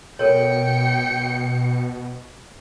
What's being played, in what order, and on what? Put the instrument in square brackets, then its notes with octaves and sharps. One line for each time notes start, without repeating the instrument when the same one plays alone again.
[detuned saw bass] B2 [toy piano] A4 A#4 C#5 [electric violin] G5 C#7